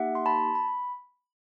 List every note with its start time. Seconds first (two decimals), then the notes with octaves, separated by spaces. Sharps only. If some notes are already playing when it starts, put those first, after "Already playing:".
Already playing: A#3 D#4 G4 E5 F#5
0.15 C6
0.26 A5 B5
0.55 B5